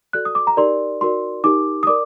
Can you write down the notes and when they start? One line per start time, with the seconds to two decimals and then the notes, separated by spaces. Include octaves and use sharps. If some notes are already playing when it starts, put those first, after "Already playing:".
0.13 F#4 A4 D5 F#6
0.25 D#6
0.35 D6
0.47 A#5
0.57 D#4 G4 A#4 D5 C6
1.01 D#4 F#4 A#4 D5 C6
1.44 D#4 G4 A#4 D6
1.83 D#6
1.87 A#4 D5 D6